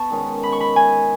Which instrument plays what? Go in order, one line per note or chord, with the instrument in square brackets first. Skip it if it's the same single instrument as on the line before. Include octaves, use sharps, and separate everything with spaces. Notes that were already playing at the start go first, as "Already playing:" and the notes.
Already playing: [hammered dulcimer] B3 [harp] A5 C#6
[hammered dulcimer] D#3 G#3 C#4
[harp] B5
C#6
B5
G#5